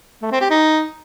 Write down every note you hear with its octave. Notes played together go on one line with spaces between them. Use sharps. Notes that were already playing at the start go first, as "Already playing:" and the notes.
A3
C4
G4
D#4